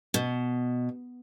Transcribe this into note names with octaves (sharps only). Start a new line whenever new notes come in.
B2